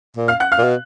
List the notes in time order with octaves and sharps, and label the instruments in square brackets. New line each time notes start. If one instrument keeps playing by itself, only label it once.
[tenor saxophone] A#2
[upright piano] F5 F6
F#5 F#6
F5 F6
[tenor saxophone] A#2
B2